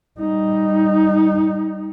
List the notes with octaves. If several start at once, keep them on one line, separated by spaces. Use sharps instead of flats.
G3 D#4